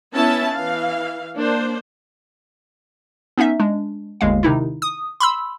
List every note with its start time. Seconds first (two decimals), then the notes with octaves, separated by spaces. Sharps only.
0.14 B3 C#4 E4 E5 A5
0.54 E3 F5
1.36 A#3 D4 C5
3.38 B3 C#4 D#4 E5
3.60 G#3 D4
4.21 G1 D#2 G#3 F5
4.43 C3 D#3 D#4 E4
4.82 D#6
5.20 B5 C6 E6